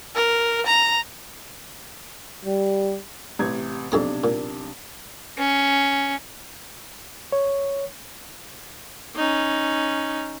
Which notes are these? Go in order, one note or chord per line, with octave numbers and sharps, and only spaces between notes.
A#4
A#5
G3
A1 C3 G#6
B1 F2 C3 D4 G#4 D6
A#2
C#4
C#5
C#4 D#4